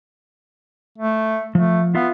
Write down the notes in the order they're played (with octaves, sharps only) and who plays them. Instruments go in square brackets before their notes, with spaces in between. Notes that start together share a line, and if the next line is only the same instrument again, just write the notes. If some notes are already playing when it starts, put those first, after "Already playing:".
[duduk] A3
[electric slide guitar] F3 [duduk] A3
[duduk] B3 [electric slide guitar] F4 E5 F5